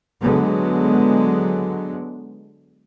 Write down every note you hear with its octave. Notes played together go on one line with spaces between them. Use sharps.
D3 F#3 G#3 B3